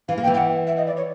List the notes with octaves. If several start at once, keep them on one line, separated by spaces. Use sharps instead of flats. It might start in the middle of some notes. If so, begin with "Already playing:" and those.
E3 F5
A#3
G5
E3
G5
F#5
E5
D#5
D5
C#5